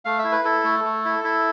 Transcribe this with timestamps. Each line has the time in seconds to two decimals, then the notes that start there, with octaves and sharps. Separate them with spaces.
0.05 A3 F5
0.19 E5
0.24 E4
0.32 B4
0.45 E4 A4
0.64 A3
0.84 A3
1.05 E4
1.24 E4